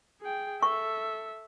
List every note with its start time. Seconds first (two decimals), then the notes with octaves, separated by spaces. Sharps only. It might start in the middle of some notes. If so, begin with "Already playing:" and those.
0.21 G#4 G5
0.63 A4 E5 C#6